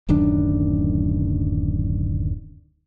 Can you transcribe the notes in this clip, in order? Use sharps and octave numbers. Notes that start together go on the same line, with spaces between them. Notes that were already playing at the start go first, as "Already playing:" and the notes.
D1 F#2 D#3 D4